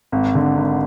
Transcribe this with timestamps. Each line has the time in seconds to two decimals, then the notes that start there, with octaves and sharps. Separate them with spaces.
0.12 G#1
0.35 D3
0.57 G#1